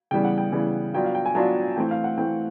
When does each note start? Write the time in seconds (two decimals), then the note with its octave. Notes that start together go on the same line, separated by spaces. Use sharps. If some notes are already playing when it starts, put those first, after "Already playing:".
0.11 C#3 E3 G3 B3 G5
0.24 F#5
0.38 G5
0.52 C#3 E3 G3 B3
0.94 F#3 B3 D4 F4 G5
1.04 F5
1.15 G5
1.25 G#5
1.35 F#3 B3 D4 F4 A5
1.76 E3 A3 C4 G5
1.91 F5
2.04 F#5
2.18 E3 A3 C4 G5